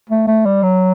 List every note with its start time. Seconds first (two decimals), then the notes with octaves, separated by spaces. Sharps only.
0.10 A3
0.27 A3
0.46 G3
0.63 F#3